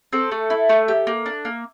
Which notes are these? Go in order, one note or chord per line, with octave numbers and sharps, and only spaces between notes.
C4 A4
A3
E4
A3
G4
A#3
D4
A#3